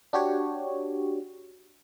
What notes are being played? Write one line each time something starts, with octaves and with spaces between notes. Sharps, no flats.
D4 F#4 G4 C#5